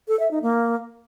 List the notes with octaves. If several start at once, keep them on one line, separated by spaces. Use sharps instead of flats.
A4
E5
D#4
A#3